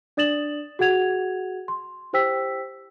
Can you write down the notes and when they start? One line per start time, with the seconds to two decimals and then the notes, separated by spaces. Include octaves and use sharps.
0.17 D4 D5 D#6 A6 E7 F#7
0.79 F#4 G#4 F#5 G#6 F7
1.68 C6
2.13 E4 G4 C5 G5 E6 B6